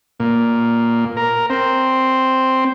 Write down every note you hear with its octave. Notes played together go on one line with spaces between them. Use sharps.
A#2
A#4
C4